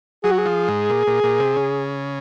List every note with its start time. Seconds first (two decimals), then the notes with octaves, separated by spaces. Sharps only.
0.24 F#3 G#4
0.31 F#4
0.38 G#4
0.46 F3
0.68 G#2
0.90 A#2
1.07 A#2
1.24 A#2
1.40 C3
1.56 C#3